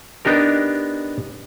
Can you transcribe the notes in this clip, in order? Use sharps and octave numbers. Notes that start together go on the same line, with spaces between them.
B3 D4 D#4 G4 A#4